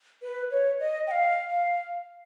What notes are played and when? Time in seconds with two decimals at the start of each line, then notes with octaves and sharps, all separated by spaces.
0.22 B4
0.51 C#5
0.80 D#5
1.07 G5
1.11 F5
1.50 F5